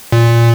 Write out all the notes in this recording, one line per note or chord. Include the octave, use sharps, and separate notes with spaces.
A#2